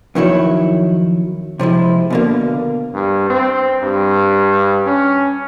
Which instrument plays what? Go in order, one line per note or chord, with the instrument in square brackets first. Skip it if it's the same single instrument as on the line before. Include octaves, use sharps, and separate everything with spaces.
[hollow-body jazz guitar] F2 D#3 F#3 E4 C#5
C3 F3 G#3 E4
B2 D3 A#3
[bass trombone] G2
C4
G2
C#4